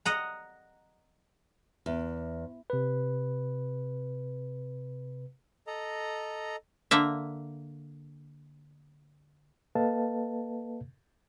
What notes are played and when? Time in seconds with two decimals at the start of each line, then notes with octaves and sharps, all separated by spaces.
0.05 D#5 F#5 A#5
1.86 E2
2.70 C3 B4
5.67 A4 D#5 A#5
6.91 D3 A#3 E5
9.75 A#3 A4 B4 D#5 F5 A5